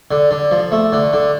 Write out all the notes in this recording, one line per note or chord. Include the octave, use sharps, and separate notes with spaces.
D3
D3
F3
A3
D3
D3